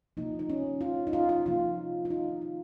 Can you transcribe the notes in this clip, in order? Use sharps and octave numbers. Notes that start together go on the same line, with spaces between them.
C3 F3 A#3 D#4
D#4
C#4
F4
D#4
F4
F4
C3 F3 A#3 F4
F4
D#4
D#4